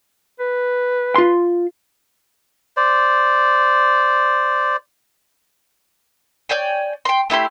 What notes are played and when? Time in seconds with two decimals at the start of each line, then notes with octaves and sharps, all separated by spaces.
0.40 B4
1.16 F4 C6
2.77 C5 D5
6.49 C#5 D5 G5 G#5
7.05 G5 C6
7.30 A3 E4 G4 C6